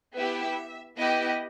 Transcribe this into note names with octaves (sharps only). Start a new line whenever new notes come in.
B3 E4 G4 E5
B3 E4 G4 D#5